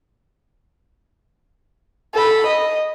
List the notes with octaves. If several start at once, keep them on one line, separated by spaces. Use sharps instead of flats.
A4 B5
D#5